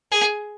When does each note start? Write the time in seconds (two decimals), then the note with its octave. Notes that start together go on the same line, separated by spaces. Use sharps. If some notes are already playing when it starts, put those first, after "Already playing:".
0.11 G#4